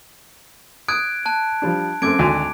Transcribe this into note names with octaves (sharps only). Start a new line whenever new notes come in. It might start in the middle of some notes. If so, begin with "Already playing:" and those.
D#6 F#6 G#6 D7
A5 F#6
F3 G3 D4
F#2 A3 C4 D6 G#6 D7
G#1 D2 G#5